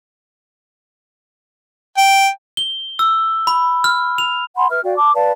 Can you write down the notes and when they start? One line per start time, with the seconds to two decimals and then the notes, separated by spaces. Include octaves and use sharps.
1.97 G5
2.57 G7
2.99 E6
3.47 B5
3.84 F6
4.18 F7
4.57 F#5 G#5 B5 C6
4.70 B4 E5 F6
4.84 F#4 D5 F5 G5
4.96 A5 D6
5.14 B4 D5 F5 A5